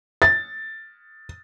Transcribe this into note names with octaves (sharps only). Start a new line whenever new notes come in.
A6